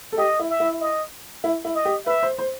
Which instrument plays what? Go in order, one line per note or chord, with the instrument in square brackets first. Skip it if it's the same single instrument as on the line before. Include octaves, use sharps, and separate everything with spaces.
[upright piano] A4
[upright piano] G4 [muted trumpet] D#5
[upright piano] E4
[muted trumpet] E5
[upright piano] E4
[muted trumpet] D#5
[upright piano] E4
E4
[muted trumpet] D#5
[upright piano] G4
[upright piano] B4 [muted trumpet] E5
[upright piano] C5
C5